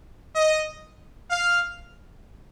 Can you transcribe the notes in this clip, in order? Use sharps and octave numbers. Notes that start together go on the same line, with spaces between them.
D#5
F5